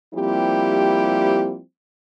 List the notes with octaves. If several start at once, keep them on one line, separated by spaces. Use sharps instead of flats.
F3 G3 A#3 C4 E4 G4